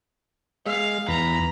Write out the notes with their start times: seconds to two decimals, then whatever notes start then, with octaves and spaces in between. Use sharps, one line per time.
0.66 G#3 F5
1.08 E2 A#5 B5